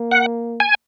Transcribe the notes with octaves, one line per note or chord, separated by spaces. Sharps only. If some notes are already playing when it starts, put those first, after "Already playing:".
Already playing: A#3
F#5
G#5